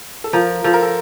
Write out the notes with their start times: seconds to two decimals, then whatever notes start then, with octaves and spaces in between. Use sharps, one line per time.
0.24 A4
0.33 F3 A#4
0.64 F3 A4
0.74 A#4
0.82 A4